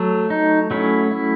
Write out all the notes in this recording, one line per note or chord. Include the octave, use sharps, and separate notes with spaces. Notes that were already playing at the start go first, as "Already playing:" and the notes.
Already playing: F#3 A3
D#4
F#3 A3 C#4 E4
E4